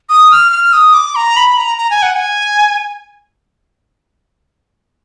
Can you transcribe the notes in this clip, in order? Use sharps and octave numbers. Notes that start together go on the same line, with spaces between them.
D#6
F6
F6
D#6
D6
A#5
B5
A#5
A#5
G#5
F#5
G#5